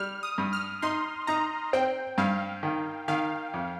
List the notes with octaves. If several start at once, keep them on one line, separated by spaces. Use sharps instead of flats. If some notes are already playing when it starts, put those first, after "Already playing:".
Already playing: G3 F6
D#6
G2
F6
D#4 C6
D#4 A#5
C4 G5
G2 F5
D#3
D#3 F5
F2